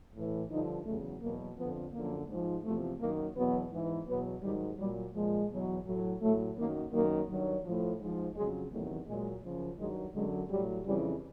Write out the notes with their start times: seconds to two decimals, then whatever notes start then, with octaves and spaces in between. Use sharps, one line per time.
0.14 A2 E3
0.50 G2 D3 F3 D#4
0.86 E2 C#3 F#3 A3
1.21 E2 B2 F#3 A#3
1.57 F2 D3 F3 B3
1.93 F#2 D3 F3 A#3
2.28 G#2 F3
2.64 E2 C3 F3 A3
3.00 F#2 D#3 F#3 A#3
3.35 E2 B2 F#3 B3
3.72 G#2 E3
4.07 E2 B2 F#3 B3
4.42 G#2 D#3 F#3 G3
4.78 A#2 F#3 G3
5.14 A#2 F3 G#3
5.50 E2 B2 F#3
5.85 A2 F#3
6.21 A2 F#3 A3
6.57 F#2 D#3 F#3 A#3
6.92 F#2 D#3 F#3 A#3
7.29 G2 D#3 F#3
7.64 A2 F3
7.99 G#2 F3
8.35 F2 C#3 F#3 G#3
8.71 E2 C3 D#3 F#3 A3
9.06 A#2 F#3 G#3
9.43 F#2 C#3 F3
9.78 G2 D#3 F#3 G#3
10.14 F#2 D3 F#3 G#3
10.50 A2 F#3 G3
10.85 F2 C#3 E3 G3